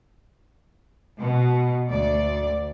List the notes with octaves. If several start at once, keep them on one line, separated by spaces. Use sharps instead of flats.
B2
D2 D5